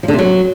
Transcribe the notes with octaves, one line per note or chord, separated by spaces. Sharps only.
F3
D3
C3
F#3